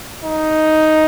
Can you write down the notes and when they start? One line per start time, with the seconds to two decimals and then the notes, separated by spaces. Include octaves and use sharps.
0.24 D#4